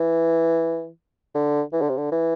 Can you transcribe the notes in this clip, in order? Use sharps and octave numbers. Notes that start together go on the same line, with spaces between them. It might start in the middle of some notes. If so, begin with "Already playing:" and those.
Already playing: E3
D3
E3
D3
C3
D3
E3